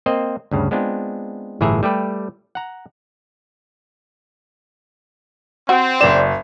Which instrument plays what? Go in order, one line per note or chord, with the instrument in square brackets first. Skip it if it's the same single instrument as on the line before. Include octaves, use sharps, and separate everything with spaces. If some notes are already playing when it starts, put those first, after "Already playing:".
[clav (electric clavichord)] A#3 C4 C5 D#5
D2 G2 C#3
G#3 B3 C4 D4 F4
G1 A2 E3 G#4 E5 A#5
G3 A3 G4 B4
F#5 A#5
[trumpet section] C4 [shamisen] F#4
[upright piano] F#1 E7 [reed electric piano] D5